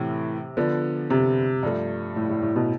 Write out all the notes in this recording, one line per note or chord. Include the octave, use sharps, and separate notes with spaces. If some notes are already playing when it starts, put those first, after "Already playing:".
Already playing: A2 C3 E3 A3
D3 F3 B3 D4
C3
G2 F3 A3
A2
A2
A2
B2